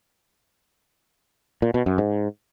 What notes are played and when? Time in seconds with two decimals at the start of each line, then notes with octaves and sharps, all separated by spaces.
1.62 A#2
1.74 B2
1.86 F#2
1.98 G#2